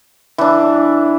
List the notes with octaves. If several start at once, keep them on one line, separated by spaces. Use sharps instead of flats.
E3 D4